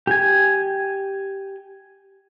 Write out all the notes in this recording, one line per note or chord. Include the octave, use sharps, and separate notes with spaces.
G4 G#5